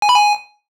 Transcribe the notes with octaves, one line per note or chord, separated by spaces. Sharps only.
G#5
B5
G#5